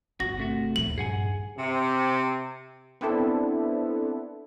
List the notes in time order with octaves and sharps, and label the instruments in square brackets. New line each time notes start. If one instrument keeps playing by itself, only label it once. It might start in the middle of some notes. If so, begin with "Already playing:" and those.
[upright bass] G1 [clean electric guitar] F#4 [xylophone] A#6
[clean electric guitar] C3 A3 F#4
[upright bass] A#1 D#2 [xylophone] F#7
[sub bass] G2 [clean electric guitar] G#4 F#5 G#5
[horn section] C3
[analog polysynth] B3 C4 D4 E4 A4